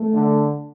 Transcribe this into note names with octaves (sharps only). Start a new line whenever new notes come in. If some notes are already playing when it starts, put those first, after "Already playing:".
Already playing: A3
D3